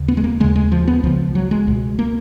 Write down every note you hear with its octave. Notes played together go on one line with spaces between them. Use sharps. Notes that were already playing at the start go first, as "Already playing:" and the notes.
Already playing: D#2 C#3
B3
G#3
A#3
D#2 C#3 G#3
G#3
F3
B3
C#2 C#3 F3
F#3
G#3
C#2 B2
A#3